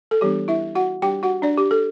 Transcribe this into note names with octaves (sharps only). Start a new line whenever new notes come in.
A4
E3 G3 B3 D4 G4
E4 E5
F#4 F#5
G3 D4 G4 G5
F#4 F#5
D4 D5
G4
A4